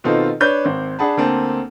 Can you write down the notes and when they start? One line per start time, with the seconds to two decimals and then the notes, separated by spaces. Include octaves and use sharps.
0.04 B2 D#3 C4 D#4 F4 A4
0.40 D4 B4 C#5 G6
0.65 G#1 C4
0.99 D4 G#4 F#5 A5 B5
1.17 D2 A#3 C4 A5